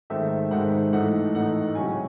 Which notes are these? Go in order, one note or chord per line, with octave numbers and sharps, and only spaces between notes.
G#2 D#3 A3 C4 E5
G#2 D#3 A3 C4 F#5
A2 E3 A3 D#4 F#5
A2 E3 A3 D#4 F#5
C#2 C3 F#3 C#4 G#5